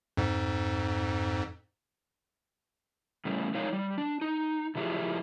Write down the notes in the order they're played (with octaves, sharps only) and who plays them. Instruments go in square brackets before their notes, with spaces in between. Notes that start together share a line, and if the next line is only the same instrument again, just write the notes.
[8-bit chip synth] F2 G#2
[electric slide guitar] A2 C#3 G3
G#3 D#4 C#5 F5
G3
D4
D#4
C#3 F3 E4 G4 G#4